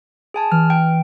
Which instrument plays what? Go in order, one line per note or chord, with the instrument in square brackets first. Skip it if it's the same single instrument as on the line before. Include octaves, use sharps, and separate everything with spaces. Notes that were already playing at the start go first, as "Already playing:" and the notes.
[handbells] G#4 G#5 A5
[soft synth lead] E3 [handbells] F6
[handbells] G5